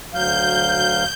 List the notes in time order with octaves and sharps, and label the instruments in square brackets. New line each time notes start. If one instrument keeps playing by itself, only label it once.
[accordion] D2 F#3 F5 [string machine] G6